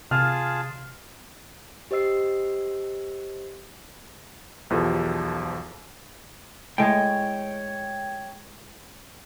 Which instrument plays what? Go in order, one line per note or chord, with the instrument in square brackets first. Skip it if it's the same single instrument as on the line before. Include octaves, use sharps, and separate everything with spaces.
[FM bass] C3 [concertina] F4 G#4 A5 [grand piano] F6
[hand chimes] G4 C5 D#5 E6 C7
[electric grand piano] B1 E2 F3 G4 A4
[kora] A2 G#3 [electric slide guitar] C#5 G5